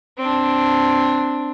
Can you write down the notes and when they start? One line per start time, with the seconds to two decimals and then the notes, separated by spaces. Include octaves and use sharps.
0.18 C4 D4